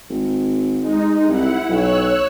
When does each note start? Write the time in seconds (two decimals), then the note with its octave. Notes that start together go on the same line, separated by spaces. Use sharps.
0.10 G#1
0.79 G#3 D#4
1.28 C2 E4 F#5
1.69 B1 C#5 E6 F#6